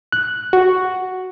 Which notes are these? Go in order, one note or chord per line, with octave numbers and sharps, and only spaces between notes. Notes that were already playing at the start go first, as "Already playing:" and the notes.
F#6
F#4